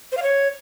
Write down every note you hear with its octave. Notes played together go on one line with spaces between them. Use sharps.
C5
F5
C#5